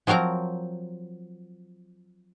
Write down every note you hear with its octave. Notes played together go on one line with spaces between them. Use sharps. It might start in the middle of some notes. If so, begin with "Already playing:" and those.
F3 F#3 C4 A#4 A#5